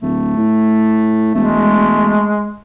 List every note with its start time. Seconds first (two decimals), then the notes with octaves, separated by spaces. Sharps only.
0.02 D1 A3
0.37 A2
1.35 E1 G#3 A3